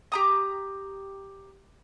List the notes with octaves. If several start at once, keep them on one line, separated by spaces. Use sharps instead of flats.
G4 A#5 D#6